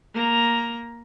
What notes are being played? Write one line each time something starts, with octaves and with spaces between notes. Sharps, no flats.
A#3 A#5